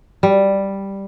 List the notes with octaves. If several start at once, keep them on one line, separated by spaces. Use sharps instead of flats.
G3